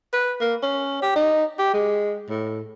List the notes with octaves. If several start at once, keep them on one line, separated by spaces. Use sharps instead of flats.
B4
A#3
C#4
G4
D#4
G4
G#3
A2